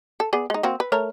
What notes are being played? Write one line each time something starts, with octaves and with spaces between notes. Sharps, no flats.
A4
B3 G#4 D5
G#3 D#4
A#3 C4 F#4
B4
A3 A#4 C#5